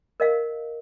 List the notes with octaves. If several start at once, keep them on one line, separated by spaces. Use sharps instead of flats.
A#4 D#5 F5